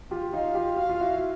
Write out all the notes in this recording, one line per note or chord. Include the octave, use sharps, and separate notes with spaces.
F4 G4
D#4 F4 F5
F4 G4
F#4 F5
F4
E4 F#4